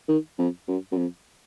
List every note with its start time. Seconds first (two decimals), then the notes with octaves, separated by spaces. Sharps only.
0.08 D#3
0.39 F2
0.68 F#2
0.92 F#2
0.97 F2